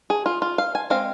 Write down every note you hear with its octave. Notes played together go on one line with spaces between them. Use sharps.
G#4
F4
F4
F5
G#5
G#3 C4 F5